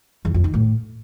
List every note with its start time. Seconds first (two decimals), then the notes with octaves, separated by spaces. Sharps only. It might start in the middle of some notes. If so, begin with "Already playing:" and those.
0.25 E2
0.34 F2
0.44 D#3
0.54 A2